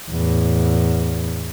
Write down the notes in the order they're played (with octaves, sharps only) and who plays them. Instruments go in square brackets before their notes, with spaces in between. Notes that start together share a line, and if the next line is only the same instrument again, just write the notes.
[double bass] E2 A2